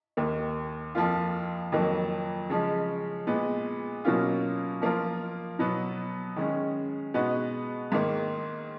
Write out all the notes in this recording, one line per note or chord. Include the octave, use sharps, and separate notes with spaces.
D#2 D#3 A#3
F2 F3 A#3 F4
F2 D#3 F#3 A#3
C#3 F3 G#3
A#2 G#3 B3
B2 F#3 A#3 C#4 F4
F3 A#3 F4 A#4
B2 F#3 B3
D#3 G#3 C#4
B2 G#3 B3 D#4 F#4
G#2 D#3 A#3